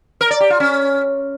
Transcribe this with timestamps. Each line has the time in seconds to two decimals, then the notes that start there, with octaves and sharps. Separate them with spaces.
0.21 A#4
0.31 D5
0.40 G4
0.50 F4
0.60 C#4